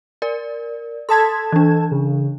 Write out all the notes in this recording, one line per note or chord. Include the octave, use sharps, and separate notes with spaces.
A#4 D5
A4 A5 C6 D#6 G#6 B6
E3 D4
C#3